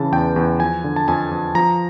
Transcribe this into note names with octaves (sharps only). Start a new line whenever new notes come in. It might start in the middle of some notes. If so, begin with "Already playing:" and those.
Already playing: C#3 E3 A5
E2 G5
E2
F3 G#5
D3
A5
F2 G#5
F2
F3 A#5